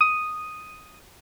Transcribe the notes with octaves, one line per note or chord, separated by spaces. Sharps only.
D#6